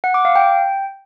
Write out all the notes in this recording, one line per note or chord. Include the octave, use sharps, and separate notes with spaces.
F#5
D6
F5
G5